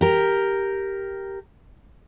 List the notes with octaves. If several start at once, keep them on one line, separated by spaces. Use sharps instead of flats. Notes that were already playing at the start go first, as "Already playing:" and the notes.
G4 A#4